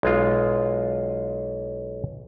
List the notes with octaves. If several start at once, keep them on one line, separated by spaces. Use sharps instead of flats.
B1 G#3 F4